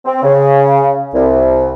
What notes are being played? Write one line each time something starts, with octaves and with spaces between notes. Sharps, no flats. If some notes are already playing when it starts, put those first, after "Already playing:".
C4
C#3
C2